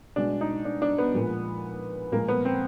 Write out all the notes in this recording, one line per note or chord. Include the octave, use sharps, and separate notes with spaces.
B2 G#3 D4
D#4
D4
D4
B3
A#2 F3 G#3
A#2 F3 G#3 A#3
B3
C4